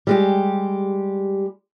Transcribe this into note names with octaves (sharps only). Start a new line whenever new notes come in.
G3 G#3 G4